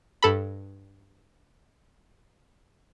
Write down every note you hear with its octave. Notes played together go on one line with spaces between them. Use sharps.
G2 A4 B5